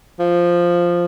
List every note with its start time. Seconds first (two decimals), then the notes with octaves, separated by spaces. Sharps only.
0.20 F3